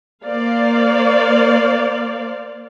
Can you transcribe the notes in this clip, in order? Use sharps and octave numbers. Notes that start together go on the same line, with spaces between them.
A#3 C5 D5 F5